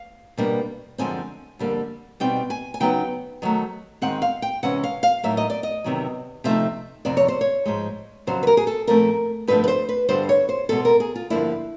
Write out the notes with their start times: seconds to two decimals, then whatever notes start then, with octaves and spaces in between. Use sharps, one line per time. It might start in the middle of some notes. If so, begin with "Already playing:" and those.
Already playing: F5
0.37 B2 G3 A#3 D4
0.98 F#2 D3 F3 G#3 C4 G#5
1.59 F2 D3 G3 A#3
2.20 B2 G3 C4 D#4 G5
2.50 G#5
2.74 G#5
2.80 C#3 F#3 B3 D#4 G5
3.42 D#3 F#3 A3
4.02 D#3 G#3 C4 F#5
4.22 F5
4.42 G5
4.63 C3 E3 G#3 C#4 F#5
4.84 F5
5.03 F5
5.24 A2 F#3 A#3 D#4 E5
5.37 D#5
5.50 D5
5.63 D#5
5.84 E2 C3 D#3 F#3
6.44 C3 F3 A3 C4 D#4 E5
7.05 F2 C3 D#3 D5
7.17 C#5
7.28 C5
7.41 C#5
7.65 G#2 F3 G#3
8.27 F2 C#3 F#3 C5
8.43 B4
8.47 A#4
8.57 G#4
8.67 A4
8.87 A#2 F3 A3 C4 A#4
9.47 G2 D3 F3 A3 D4 B4
9.64 B4
9.68 C5
9.89 B4
10.08 G2 D3 G3 B3 D4 C5
10.29 C#5
10.49 C5
10.69 E2 B2 G#3 A4
10.85 A#4
11.00 G#4
11.15 F4
11.30 G2 D3 F3 A#3 D4 E4